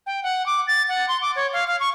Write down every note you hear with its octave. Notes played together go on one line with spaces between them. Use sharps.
G5
F#5
D6
A6
F#5
C6
D6
C#5
F5
F5
C#6